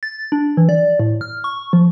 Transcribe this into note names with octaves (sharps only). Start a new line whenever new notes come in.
A6
D4
E3
D5
A2
F6
C#6
F3